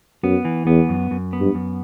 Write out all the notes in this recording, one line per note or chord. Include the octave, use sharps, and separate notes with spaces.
F#2 B3
E3
E2 B3
F#2
F#2
B3
G2
F#2